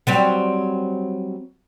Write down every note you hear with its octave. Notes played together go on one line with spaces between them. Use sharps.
F#3 G3 C4